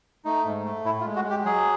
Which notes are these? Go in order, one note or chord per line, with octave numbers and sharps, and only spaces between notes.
A3 D#4
G#2
A3
A2 E4
F4
G#3
F#4
G#3
G4
F#3 G#4